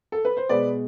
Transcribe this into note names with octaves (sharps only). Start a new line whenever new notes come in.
A4
B4
C5
B2 G#3 B4 D5